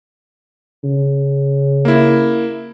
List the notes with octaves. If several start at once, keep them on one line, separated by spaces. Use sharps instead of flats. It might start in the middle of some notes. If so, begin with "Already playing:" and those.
C#3
A#3 E4